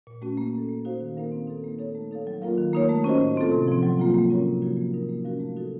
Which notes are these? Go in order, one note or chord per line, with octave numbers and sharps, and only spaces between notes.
A#2
A3 C#4 F#4
A#3
C#4 A4
A#3
D#4 F#4 C5 F5
D#3
A#3 D#4 A#4 F5
C4
D#4 A4
A#3
D#4 A4 C#5
A3
D#4 A4 C#5 F5
F#3
A#3 F4 A#4 F5
D#3
A#3 D#4 A#4 C#5
A3
C#4 F#4 C5 D#5
A2
A3 C4 F4 A4
C3
F3 C4
F#3
A#3 F4
A#3
C#4 F#4 A#4 C#5
C3
F3 A#3 D#4 F#4
A#3
D#4 A#4
A#3
C#4 F#4 A#4 F5
A3
D#4 F#4 A4